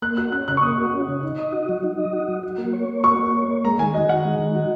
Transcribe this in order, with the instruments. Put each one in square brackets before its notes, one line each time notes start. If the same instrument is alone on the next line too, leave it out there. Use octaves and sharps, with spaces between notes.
[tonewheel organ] A#3 [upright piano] F#6
[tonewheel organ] F#4 [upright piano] F#6
[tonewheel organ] C#4 [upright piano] F#6
[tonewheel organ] C#3 [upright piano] F#6
[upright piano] C#6
[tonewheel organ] A#3 [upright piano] D#6
[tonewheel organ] F#4
C#4
C#3
D#4
D#5
F#4
F#3
D#4
D#5
F#4
F#3
F#4
A#3
C#5
A#3
[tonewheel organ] F#4 [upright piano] C#6
[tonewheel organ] A#3
C#5
A#3
[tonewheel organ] G#3 [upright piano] A#5
[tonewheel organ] D#3 [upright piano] G#5
[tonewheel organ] F#4 [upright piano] D#5
[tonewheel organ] D#3 [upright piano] F#5
[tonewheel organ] G#3
D#3
F#4